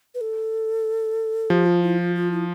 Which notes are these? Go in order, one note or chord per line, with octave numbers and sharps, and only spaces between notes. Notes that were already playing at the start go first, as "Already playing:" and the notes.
B4
A4
F3 G4
F4
E4
F4
F4
E4